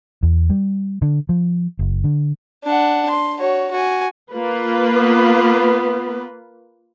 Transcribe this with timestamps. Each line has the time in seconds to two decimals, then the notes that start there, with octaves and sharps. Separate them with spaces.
0.23 E2
0.50 G3
1.02 D3
1.29 F3
1.79 F#1
2.04 D3
2.64 D4 F#5
3.09 C6
3.40 F#4 C#5
3.71 F#4 G#5
4.32 A#3 F4 B4
4.95 B3